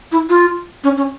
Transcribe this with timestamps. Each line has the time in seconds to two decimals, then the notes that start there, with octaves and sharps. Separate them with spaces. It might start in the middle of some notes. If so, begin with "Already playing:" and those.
0.12 E4
0.30 F4
0.84 C#4
0.97 C#4